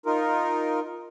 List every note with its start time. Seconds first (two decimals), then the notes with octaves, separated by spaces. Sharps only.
0.06 D#4 F4 A#4